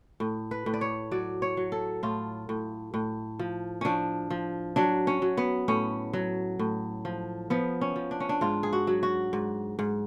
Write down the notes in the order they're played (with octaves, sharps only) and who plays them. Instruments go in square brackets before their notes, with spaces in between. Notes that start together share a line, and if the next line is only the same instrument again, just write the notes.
[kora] A2
B4
A2
D5
C#5
F#3 D5
C#5
F#3
A4
A2 F4
A2
A2
F3
F3 C#4 D4
F3
F#3 D4
C#4
F#3
B3
A2 C#4
F#3
A2
F3
F3 B3
C#4
F3
D4
C#4
D4
G#2 F4
G#4
F#4
F#3
F#4
G#2
G#2